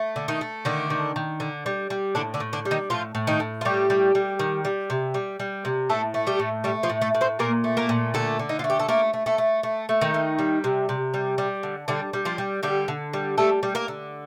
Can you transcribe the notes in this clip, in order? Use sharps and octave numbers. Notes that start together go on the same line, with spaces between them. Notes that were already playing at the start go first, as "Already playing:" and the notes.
Already playing: A3
D3
D#3 D#4
A3
D3 D#3 D4
D#3
D#3
D3
G3
G3
A2 D3 D4
D3 D4
A2
D3 D4
G3
D#3 D#4
A2 F3 F4
A2
D#3 D#4
A2
F4
A2 G3 G4
G3
G3
D#3
G3
C3
G3
G3
C3
A2 A3 A4
A3
G3 G4
A2
G3 A3 G4
F3 F4
A2
A3 A4
A2
C4 C5
A#2 A#3 A#4
A3
A#3 A#4
A#2
D3 A3 A4
D3
D#4
F4
A3
G4
A4
A3 A#3 A#4
A3
A3 A4
A3
A3
A3
D#3 D#4
A3
G3
C3
C3
G3
G3
D3
D3 G3 D4
G3
F3 F4
G3
D3 G3 G4
D3
G3
G3 A3 A4
G3
A#3 A#4
D3